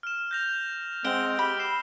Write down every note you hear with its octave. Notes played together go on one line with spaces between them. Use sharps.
F6 E7
G6 A#6 F7
G#3 C4 F#5 D7 G7
G4 B5 E6 F6
C7 E7